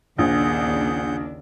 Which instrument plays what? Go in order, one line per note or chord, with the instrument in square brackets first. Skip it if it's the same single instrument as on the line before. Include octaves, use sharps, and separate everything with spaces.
[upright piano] A#1 [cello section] D#2 C#3 D4 [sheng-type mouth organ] G#4 F#5 G6